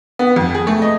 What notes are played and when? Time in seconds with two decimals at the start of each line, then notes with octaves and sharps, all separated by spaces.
0.19 B3
0.36 F2
0.54 G#4
0.67 A3
0.82 D#5